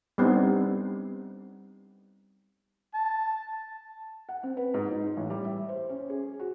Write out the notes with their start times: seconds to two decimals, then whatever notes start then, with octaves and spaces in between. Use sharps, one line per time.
0.18 G3 B3 C4 D4 D#4
2.94 A5
4.29 F#5
4.43 C4
4.57 B4
4.74 G#2
4.91 D#4
5.17 A1
5.30 G3
5.44 E5
5.69 C5
5.89 C#4
6.10 G#4
6.40 F#4